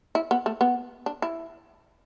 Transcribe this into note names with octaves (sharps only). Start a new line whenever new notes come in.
E4
B3
A3
B3
D4
E4